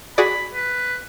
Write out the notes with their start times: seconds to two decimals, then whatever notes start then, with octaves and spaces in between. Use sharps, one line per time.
0.18 F#4 G#4 D5 B5
0.54 B4